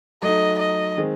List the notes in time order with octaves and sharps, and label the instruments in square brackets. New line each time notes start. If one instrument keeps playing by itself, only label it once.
[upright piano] F#3 A3 D#4 [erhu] D#5
[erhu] D#5
[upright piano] D#3 G#3 C4